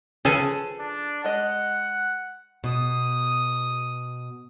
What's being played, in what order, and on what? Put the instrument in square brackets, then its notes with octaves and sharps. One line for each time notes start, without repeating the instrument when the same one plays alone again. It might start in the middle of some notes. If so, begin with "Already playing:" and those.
[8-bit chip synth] C#3 C#4 [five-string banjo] F3 B4 [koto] G#4 A4 G#5
[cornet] D4
[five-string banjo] G#3 D#5 [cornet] F#5
[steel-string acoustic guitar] B2 [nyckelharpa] D#6